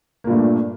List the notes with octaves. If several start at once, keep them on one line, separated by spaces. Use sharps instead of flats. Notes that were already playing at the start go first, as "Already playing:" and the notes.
G2 A#2 A3 A#3